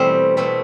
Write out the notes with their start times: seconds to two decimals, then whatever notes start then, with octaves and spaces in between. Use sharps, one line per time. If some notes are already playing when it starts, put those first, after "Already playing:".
Already playing: B2 E3 G3 A3 C4
0.37 B2 A3 C4